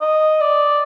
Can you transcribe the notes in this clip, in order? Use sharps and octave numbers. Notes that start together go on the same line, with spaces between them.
D#5
D5